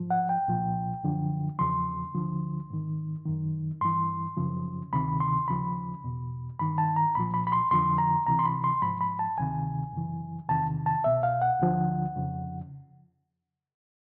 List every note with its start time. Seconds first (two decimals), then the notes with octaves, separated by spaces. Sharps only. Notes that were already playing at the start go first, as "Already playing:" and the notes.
Already playing: G#2 F3
0.10 F#5
0.29 G5
0.48 C2 A#2 F3
1.04 F#2 D3 F3
1.59 E2 C#3 F3 C6
2.14 D2 D3 F3
2.70 G#2 D#3
3.26 F#2 D#3
3.81 G2 E3 C6
4.37 F#2 C#3 F3
4.93 D2 C3 D#3 B5
5.20 C6
5.48 D#2 C#3 F3 B5
6.04 E2 B2
6.59 G2 D#3 B5
6.78 A5
6.96 A#5
7.15 C2 A#2 F3 B5
7.34 B5
7.47 B5
7.52 C6
7.71 F2 D3 F3 C6
7.98 A#5
8.27 C#2 C3 E3 A#5
8.39 C6
8.45 B5
8.64 C6
8.82 G#2 F3 B5
9.01 B5
9.19 A5
9.38 D2 C3 D#3 G#5
9.93 F#2 C#3 E3
10.49 E2 C3 D#3 A5
10.86 A5
11.04 C2 B2 E5
11.23 F5
11.42 F#5
11.60 D2 D3 F3
12.16 F2 C#3 F3